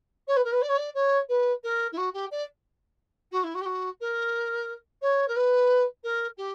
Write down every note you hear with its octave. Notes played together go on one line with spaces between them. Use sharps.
C#5
B4
A#4
B4
D5
C#5
D5
C#5
B4
A#4
E4
F#4
G4
D5
F#4
E4
F#4
G4
F#4
A#4
C#5
A#4
B4
A#4
G4